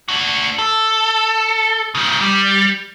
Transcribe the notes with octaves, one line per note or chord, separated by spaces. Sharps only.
D4 F#4
A4
C#3 F3
G3